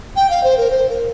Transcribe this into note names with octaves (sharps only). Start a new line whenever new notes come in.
G5
F5
C5
A#4
C5
A#4